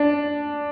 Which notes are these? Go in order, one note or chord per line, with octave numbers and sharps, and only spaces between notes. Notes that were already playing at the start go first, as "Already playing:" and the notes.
Already playing: D4